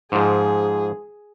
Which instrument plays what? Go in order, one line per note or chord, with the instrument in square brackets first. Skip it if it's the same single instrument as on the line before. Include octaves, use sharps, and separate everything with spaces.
[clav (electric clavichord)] G#2 F3 [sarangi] G#4